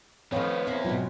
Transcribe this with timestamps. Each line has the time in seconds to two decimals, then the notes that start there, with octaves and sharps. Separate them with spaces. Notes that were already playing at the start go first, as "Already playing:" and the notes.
0.32 D#3 F3 A3 C4 B4 C#5 F5
0.67 B3 C4 F#4 A#4 C5 E5
0.85 G#2 B2 F#3 F4